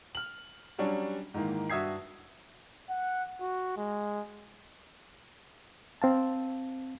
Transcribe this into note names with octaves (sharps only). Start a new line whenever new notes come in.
F6 F#7
F#3 G3 C#4 D4
G#2 D#3 E3 A#3
G2 F#4 E5 D#6 G#6 C7
F#5
F#4
G#3
C4 F5 A5